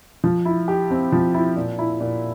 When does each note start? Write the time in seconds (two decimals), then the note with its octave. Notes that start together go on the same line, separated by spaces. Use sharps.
0.24 F3
0.45 E4
0.68 G4
0.91 C4
1.12 F3
1.34 E4
1.56 A#2
1.79 E4
2.00 A#2